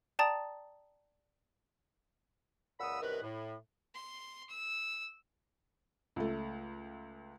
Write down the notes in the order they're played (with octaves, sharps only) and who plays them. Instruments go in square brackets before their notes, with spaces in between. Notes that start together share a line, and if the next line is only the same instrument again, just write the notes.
[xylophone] D5 G5 A5 A#5 D#6 A6
[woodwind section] C#2 A#2 F#5 B5 D#6 E6
C2 F#2 D#3 A#4 B4
A2
[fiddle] C6
E6
[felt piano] C#2 A3